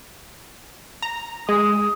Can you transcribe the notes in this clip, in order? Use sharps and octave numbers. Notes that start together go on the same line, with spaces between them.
A#5
G#3 D#6